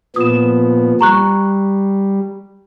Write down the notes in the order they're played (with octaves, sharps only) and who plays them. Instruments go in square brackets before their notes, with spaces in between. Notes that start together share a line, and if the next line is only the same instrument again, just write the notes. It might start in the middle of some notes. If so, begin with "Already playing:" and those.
[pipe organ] A#2 F3 B3 [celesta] D#6 E7
[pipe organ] G3 [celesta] A#5 C#6 F#6